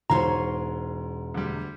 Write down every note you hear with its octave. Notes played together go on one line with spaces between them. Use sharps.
E1 G#2 F4 C5 C#5 F5 A#5 C6
D2 G3